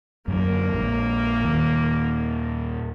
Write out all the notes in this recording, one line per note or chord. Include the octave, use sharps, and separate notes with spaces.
F#2 D3 A#3 A#4
A#1 F2 A#2
D#2 A#2 D#3